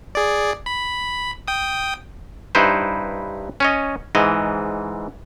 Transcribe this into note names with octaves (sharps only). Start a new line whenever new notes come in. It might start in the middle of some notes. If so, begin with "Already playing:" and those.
G#4 D5
B5
G5 D#6
G2 D#4 E4 B4 C5
C#4 C#5 D#5
G#2 E3 D#5